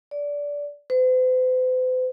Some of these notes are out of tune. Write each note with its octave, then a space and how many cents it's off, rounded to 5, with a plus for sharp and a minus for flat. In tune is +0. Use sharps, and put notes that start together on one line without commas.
D5 -20
C5 -45